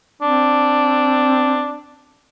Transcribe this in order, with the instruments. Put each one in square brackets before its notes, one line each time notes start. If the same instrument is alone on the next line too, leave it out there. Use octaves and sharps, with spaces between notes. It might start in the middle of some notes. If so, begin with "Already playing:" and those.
[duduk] C4 [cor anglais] D4